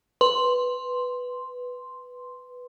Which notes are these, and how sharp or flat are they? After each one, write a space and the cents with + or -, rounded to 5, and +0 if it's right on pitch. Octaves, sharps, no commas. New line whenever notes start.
B4 +0 C6 +0